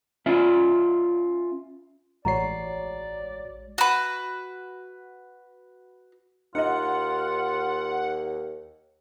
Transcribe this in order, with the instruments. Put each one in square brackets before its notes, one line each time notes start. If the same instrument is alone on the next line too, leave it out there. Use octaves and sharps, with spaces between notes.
[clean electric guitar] C#4 F4 E5
[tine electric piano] A1 F#4 C7 [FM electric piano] G#3 C#5 [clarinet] D5 [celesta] A#5
[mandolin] F#4 B4
[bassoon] D#2 [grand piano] D#4 D#5 [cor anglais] F4 [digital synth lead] F#5